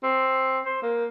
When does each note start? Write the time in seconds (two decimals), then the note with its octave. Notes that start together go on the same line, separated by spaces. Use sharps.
0.03 C4
0.65 C5
0.82 A#3